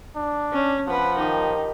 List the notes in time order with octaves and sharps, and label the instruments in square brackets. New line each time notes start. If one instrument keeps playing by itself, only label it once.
[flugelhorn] D4
[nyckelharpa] C#4
[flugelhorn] F3 [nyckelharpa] B4 F#5
[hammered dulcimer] D#3 G4 [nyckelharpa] D#4